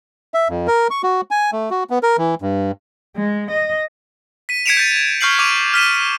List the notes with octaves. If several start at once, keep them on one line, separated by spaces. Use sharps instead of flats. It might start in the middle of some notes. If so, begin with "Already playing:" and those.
E5
F2
A#4
C#6
F#4
G#5
A3
F#4
B3
A#4
E3
G2
G#3
D#5
B6 D#7
G#6 B6 C#7 D7 E7 F7
G6 A6 D#7
C#6 F6 G6 C7 F#7
C#6 D6 D#7 F7
F6 B6 D#7 E7